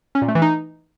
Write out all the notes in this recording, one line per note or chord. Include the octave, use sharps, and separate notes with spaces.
C#4
A#2
A3
E3
D#4